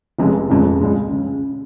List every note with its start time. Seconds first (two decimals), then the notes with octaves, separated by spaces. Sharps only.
0.19 F1 F2 C#3 G#3
0.50 F1 F2 C#3 G#3
0.81 C#2 C#3 G#3
1.13 C#3